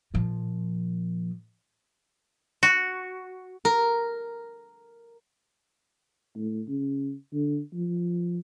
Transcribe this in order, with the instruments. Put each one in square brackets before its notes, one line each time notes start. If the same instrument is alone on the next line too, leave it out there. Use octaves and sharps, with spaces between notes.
[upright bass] A#2 F3
[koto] F#4
[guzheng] A#4
[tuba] A2
C#3
D3
F3